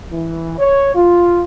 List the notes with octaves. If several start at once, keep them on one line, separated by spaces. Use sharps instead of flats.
E3
C#5
F4